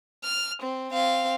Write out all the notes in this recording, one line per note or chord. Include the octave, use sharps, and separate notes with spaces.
F6
C4
C4 F5